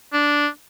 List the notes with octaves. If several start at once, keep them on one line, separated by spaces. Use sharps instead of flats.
D4